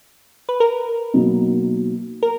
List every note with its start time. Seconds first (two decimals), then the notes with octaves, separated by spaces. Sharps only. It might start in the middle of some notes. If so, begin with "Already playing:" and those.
0.49 B4
0.60 A#4
1.14 B2 F#3 A#3 D#4
2.23 A#4